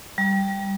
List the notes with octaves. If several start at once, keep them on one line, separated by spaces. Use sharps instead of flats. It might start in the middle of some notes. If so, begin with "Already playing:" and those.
G3